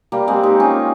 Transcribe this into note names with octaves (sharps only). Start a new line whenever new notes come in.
G3 A#3
G#3 C4
D#4 G4
C#4 F4